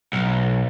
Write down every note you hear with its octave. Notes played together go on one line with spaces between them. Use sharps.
B1